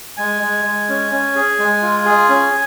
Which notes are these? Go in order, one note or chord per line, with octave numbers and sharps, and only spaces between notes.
G#3 G#5
G#3
G#3
C#4
C#4
G#4
G#3
F4
G#4
C#4